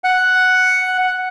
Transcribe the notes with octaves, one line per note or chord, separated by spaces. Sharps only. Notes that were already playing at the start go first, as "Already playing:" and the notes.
F#5